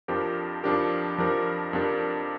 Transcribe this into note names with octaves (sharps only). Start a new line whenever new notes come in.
F2 F3 D4 G4 A#4
F2 F3 D4 G4 A#4
F2 F3 D4 G4 A#4
F2 F3 D4 G4 A#4